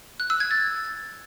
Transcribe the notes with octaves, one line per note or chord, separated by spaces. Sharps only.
F#6
E6
G#6
A6